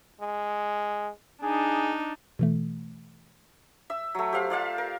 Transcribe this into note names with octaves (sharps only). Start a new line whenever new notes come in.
G#3
D4 D#4 G#4
B2 E3 A3
E5 E6
F#3 A3
G4 C5 F5
F4 D5 F5 A5
A#4